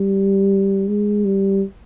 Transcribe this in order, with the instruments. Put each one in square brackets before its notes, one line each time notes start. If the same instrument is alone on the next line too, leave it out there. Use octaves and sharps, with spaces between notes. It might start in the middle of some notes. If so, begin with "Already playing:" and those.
Already playing: [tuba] G3
G#3
G3